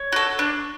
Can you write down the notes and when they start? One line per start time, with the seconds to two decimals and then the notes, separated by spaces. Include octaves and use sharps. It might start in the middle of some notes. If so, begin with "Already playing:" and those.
Already playing: C#5
0.12 F#4 A4
0.39 D4